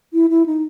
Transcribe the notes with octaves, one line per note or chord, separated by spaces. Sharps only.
E4
E4
D#4